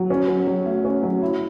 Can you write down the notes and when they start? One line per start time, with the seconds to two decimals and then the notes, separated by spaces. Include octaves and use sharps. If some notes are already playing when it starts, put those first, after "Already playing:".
Already playing: F#3
0.10 C#4
0.28 F#3
0.47 F#3
0.66 A3
0.84 C#4
1.03 F#3
1.22 E4